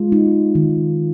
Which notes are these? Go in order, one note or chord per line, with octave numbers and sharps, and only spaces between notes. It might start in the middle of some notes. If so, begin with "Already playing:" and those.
Already playing: G#3 F4
D#4
D#3